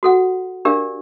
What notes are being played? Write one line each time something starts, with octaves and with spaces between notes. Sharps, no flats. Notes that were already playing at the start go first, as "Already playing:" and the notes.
F#4 A4 F#5
D4 G4 A#4 D5 F5